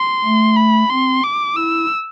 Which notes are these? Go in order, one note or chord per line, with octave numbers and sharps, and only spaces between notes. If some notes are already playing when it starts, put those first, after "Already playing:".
Already playing: C6
A3
B5
C4 C6
D6
E4 E6